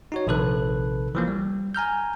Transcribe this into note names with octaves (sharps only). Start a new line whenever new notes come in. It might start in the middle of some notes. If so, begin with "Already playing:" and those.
D#4 F#4 C#5
A#1 C3 D#3 A4 B4 F#6
E3 F3 A#3
G3
G#5 A#5 F6 G6